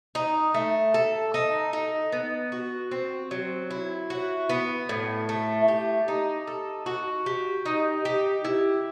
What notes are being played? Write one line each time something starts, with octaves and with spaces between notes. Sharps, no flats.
D#4
A3
A4
D#4
D#4
B3
F#4
C4
F#3
E4
F#4
B3
A2
A3
G4
D#4
A4
F#4
G4
D#4
G4
E4